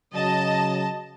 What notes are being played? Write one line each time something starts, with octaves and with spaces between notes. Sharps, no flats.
C#3 F#3 D#5 A5